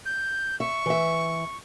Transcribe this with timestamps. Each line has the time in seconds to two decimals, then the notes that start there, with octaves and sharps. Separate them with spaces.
0.06 G6
0.60 E5 C#6
0.86 E3 E5